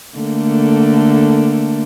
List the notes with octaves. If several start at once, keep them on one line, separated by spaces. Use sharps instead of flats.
D3 A3 A#3